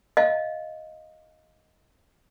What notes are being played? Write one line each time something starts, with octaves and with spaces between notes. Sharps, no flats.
D#5 F5